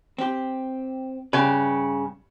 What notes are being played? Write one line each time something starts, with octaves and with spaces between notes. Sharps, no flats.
C4 G4
G2 C#3 G4 B4